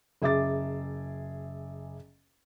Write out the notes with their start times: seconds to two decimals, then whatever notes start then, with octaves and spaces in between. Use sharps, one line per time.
0.22 F#1 G#4 E5 D6 A6